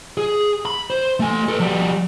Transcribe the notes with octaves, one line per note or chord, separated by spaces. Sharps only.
G#4
B5
C5
A3 G#5
A4 B4
F3 G3